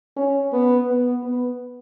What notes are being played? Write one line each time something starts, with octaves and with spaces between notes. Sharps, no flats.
C#4
B3
B3
B3